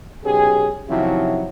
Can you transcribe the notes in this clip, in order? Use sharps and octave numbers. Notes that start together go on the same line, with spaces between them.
B1 C#4 G4 G#4
C3 D#3 F3 F#3 C#4 E4